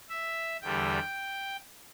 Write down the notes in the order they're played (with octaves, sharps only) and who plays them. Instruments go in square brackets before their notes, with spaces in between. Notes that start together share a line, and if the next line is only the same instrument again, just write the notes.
[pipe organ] E5
E2 D3 G3 G5